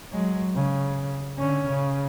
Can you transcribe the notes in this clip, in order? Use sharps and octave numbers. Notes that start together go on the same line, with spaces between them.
F#3 G#3
C#3
D3 C#4
C#3